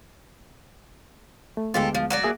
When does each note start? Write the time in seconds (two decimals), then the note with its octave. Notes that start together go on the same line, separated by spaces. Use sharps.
1.57 A3
1.74 D2 G#3 B3 F4 G4 A4
1.95 F3
2.10 F#3 F#4 D5
2.24 A#3 G#4 E5